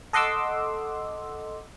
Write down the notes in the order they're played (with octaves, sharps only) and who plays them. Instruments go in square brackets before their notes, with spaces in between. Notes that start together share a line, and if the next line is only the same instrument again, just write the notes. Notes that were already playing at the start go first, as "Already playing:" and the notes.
[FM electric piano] A4 D#5 F#5 C6 D6 E6